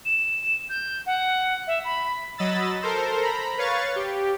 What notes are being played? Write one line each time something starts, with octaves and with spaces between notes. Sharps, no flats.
E7
G6
F#5
E5
B5
F#3 D#5 B5 E6 A6
A4 A#4 C5
A#5 B5
B4 C#5 F5 C#6 A6
G4